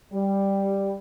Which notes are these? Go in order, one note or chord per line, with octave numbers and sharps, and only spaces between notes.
G3